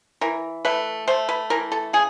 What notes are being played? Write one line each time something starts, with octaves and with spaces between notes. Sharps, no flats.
E3 A#4
A3 B4
A3 C5
B4
E3 A#4
A4
C#3 G#4